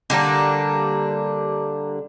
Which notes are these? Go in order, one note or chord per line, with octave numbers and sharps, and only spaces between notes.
D3 G3 A#3 D4